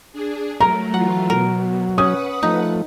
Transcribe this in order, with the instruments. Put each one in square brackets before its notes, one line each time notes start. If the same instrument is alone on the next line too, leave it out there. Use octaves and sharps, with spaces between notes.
[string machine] D4 G#4
[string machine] F#3 A3 [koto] A#4 [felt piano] A#5
[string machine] E3 A3 F4 [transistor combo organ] F#3 [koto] F#5
[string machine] B2 [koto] A#4
[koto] C#4 [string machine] B4 F#5 [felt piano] D#6
[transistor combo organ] F3 A3 [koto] D#4